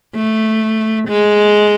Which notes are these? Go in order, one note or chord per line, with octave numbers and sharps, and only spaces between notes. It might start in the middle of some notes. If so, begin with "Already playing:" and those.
A3
G#3